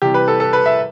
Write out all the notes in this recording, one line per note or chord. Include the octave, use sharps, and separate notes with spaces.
C3 E3 G3 G4
B4
A4
A4
B4
E5